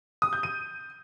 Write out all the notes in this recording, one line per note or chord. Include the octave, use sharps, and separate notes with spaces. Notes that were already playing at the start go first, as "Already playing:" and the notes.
D#6
G6
D#7